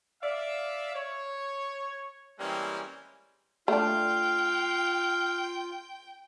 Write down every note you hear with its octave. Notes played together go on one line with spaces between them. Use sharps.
D5 E5 F5
C#5
E3 G3 G#3 A#3 C4 C#4
A3 D4 F4 F5 G5